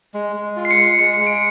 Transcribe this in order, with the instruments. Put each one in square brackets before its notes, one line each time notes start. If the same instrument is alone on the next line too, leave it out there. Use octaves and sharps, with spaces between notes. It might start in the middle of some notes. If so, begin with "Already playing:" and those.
[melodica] G#3
G#3
F4
[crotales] C7
C#7
[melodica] G#3
[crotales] C#7
[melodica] G#3 [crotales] C#7
[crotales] C#7
[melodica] G#3
[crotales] D7